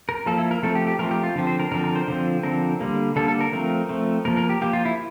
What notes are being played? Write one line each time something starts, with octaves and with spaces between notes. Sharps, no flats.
A#4
F3 A#3 A4
E4
A#4
F3 A3 C4 A4
G4
G4
F3 A3 C4 A#4
G4
F4
D3 F3 C4
C5
A#4
D3 F3 C4 A#4
A#4
C5
D3 F3 C4
D3 F3 C4 A#4
D3 G3 A#3
D3 G3 A#3 A4
A4
A#4
F3 A3 C4 A#4
F3 A3 C4
F3 A#3 A#4
A#4
G4
F3 A#3 G4
F4
E4